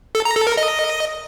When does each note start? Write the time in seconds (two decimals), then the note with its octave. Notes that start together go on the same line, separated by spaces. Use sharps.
0.15 A4
0.25 A#5
0.36 A4
0.47 A#4
0.57 D#5